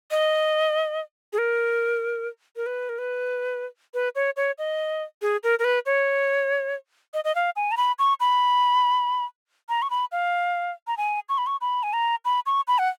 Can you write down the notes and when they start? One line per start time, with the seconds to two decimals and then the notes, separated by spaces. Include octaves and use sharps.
0.11 D#5
1.33 G#4
1.38 A#4
2.56 A#4
2.66 B4
2.89 A#4
2.98 B4
3.94 B4
4.15 C#5
4.37 C#5
4.58 D#5
5.22 G#4
5.43 A#4
5.59 A#4
5.64 B4
5.86 C#5
7.14 D#5
7.24 D#5
7.35 F5
7.56 G#5
7.71 A#5
7.77 B5
7.99 C#6
8.20 B5
9.69 A#5
9.82 C#6
9.90 B5
10.12 F5
10.87 A#5
10.97 G#5
11.29 C#6
11.38 B5
11.47 C#6
11.61 B5
11.83 G#5
11.93 A#5
12.25 B5
12.46 C#6
12.67 B5
12.78 F#5